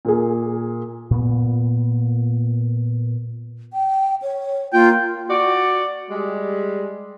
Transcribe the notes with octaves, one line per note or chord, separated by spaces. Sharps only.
A#2 A#3 G#4
A#2 B3
G5
C#5
A#3 F4 G5
F#4 D5
G3 G#3